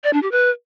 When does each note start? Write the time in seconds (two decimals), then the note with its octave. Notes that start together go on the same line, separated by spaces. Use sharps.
0.04 D5
0.13 D4
0.22 G4
0.32 B4